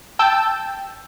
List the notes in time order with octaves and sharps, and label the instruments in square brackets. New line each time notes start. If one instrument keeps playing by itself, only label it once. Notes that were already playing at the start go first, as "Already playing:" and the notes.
[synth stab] G5 A5 E6 G6